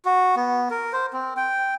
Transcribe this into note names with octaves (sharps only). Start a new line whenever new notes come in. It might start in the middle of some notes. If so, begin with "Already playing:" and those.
F#4
B3
A#4
C5
C4
G5